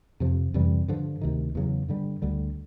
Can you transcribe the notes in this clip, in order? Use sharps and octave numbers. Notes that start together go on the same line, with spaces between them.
F2 C3 F3
F2 C3 E3 G3
G2 D3 F3
D2 C3 D#3
E2 C#3 F#3
G2 D3 G3
D2 D3 G3